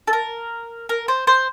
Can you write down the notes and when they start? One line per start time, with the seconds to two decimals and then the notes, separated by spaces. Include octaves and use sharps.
0.07 A4
0.13 A#4
0.89 A#4
1.08 C5
1.27 C5